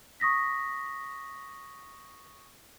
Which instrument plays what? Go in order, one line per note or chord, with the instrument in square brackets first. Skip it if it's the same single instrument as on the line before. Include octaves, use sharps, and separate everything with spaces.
[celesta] C#6 D#6 A#6 B6